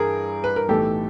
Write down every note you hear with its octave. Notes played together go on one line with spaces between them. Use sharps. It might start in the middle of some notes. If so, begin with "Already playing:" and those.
Already playing: G2 E3 G3 G#4 A#4
B4
A#4
B1 A2 E3 A3 G4 A4